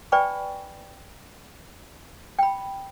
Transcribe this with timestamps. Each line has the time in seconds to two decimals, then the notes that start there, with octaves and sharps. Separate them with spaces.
0.12 B4 D5 G5 G#5 B5 C#6
2.39 G5 B5